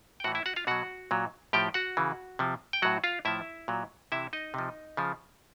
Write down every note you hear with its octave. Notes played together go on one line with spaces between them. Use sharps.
G5
A2 E3 F#4 F#5
E4 E5
F#4 F#5
F4 F5
B2 F#3 F#4 F#5
A#2 F#3
A2 F3 G4 G5
F#4 F#5
C#3 E3
C3 F3
G5
A2 F#3 F#4 F#5
F4 F5
A2 F3 E4 E5
A#2 F#3
C3 E3 E4 E5
D#4 D#5
C3 F3
C#3 F3